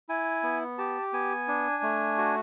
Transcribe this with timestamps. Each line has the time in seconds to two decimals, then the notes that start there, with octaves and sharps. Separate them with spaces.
0.09 E4 G#5
0.43 B3
0.78 G4 A5
1.13 B3 G#5
1.48 D4
1.83 A3
2.18 F#4